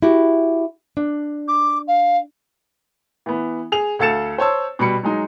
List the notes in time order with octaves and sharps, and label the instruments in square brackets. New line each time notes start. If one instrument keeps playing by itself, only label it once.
[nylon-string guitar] E4 F#4 G4
D4
[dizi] D6
F5
[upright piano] E3 B3
G#4 F7
D2 A4 F5 A6 C#7 E7
C5 C#5 A5 E6
B2 G3 B5 C#7
F#3 G#3 D#4